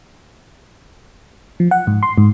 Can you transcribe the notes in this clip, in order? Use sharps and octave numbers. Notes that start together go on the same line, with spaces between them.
F3
F#5
G#2
C6
G#2